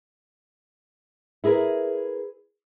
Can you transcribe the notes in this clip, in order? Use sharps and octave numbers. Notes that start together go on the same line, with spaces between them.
E4 G#4 A#4 B4